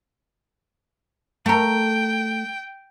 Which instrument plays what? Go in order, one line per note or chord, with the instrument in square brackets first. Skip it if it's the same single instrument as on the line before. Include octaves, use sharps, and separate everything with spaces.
[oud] A3 A#4 [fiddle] G5